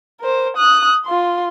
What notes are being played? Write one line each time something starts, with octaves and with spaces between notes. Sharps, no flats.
A#4 C5
D#6 F#6
F4 C6